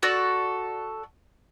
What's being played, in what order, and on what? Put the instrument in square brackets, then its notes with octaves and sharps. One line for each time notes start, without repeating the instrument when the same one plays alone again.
[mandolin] F#4 A4 D5